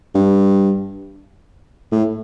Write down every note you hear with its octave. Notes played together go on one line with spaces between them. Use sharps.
G2
A2